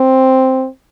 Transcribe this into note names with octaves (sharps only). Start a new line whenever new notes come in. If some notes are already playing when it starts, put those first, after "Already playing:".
Already playing: C4